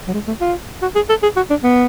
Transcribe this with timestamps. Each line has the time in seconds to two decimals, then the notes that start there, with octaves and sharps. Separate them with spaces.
0.08 F#3
0.14 G#3
0.27 A3
0.41 F4
0.82 F#4
0.95 G#4
1.09 A4
1.23 G#4
1.36 F#4
1.50 D4
1.64 B3